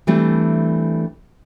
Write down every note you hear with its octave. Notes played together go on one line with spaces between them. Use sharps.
E3 G3 A3 C4 D4